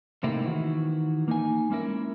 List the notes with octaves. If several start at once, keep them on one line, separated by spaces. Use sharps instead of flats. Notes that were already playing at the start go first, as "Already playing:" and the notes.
C3 A3 A#3 C4 D#4 E4
D#3 E3 F#4
A#3 D#4 G#5
G#3 A#3 C#4 E4 A#4